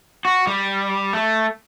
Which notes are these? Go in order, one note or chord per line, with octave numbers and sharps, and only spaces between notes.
F#4
G3
A3